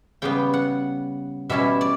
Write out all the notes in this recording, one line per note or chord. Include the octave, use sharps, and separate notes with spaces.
C#3 G3 B3 G5
F#5
B2 G3 C#4 E4 E5
D5